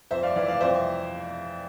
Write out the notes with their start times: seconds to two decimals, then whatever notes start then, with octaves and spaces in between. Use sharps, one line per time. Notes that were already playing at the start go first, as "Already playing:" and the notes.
0.11 F2 C5 E5
0.23 D5 F5
0.36 E3 D5 F5
0.48 D5 F5
0.60 F2 C5 E5